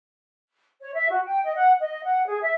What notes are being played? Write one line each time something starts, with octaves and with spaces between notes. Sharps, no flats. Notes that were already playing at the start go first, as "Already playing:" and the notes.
C#5
E5
F#4
G5
D#5
F#5
D#5
F#5
G#4
E5